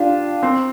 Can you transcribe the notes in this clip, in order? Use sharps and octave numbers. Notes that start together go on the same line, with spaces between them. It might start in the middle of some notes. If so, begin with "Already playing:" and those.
Already playing: D4 F4 G4
C4